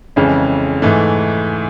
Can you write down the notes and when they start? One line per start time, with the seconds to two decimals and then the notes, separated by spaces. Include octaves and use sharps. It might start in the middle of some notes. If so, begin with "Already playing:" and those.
0.16 F2 C#3 E3 G#3 C#4
0.82 G#2 E3 A3